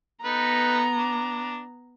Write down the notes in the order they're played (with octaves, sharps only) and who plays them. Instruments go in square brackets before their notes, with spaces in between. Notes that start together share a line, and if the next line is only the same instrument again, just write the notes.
[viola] B3 A#5 [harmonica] D#4 A4 B4
[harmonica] D4